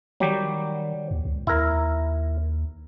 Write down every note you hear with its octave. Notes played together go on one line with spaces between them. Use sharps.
D#3 F#3 G3 G4
D#2
C#2
D#2 E4 A#4